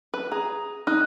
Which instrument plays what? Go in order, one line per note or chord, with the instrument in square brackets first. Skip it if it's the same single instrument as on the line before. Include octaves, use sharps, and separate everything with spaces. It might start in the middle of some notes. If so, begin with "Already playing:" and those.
[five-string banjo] B4
[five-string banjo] G#4 [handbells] A#5
[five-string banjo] D#4 [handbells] F6 F#6